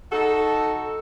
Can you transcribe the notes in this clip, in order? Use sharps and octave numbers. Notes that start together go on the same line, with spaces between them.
D#4 F#4 A4